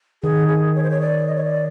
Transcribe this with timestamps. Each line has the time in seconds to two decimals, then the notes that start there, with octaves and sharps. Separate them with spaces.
0.23 D#3 G#4
0.48 G#4
0.75 C#5
0.83 C5
0.90 C#5
1.01 D5
1.27 D#5
1.36 C#5
1.45 D5